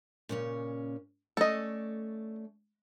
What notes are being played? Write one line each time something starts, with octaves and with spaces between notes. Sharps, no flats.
A#2 C#3 C#4
A3 C#4 A4 D5 D#5